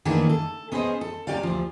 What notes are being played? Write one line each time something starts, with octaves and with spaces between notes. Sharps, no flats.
D#3 E3 A3 A#3 C#4 D4
A4
B3 C#4 G#4 B4 C5 D#5
A4
C3 F#3 C#4 G4 D5 F5
D2 F3